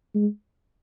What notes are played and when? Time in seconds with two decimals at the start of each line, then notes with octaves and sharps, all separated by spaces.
0.15 G#3